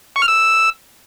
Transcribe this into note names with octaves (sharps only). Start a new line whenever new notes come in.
C#6
F6
E6